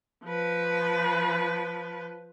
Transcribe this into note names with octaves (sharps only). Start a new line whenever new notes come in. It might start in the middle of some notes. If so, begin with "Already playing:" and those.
F3 B4